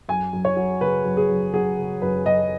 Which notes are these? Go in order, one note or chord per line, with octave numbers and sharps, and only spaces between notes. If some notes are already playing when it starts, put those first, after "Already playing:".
F#2 G#5
F#2
C#5
F#3
C#3 B4
F#2
G#4
F#2
F#3 G#4
C#3
F#2 B4
F#2 D#5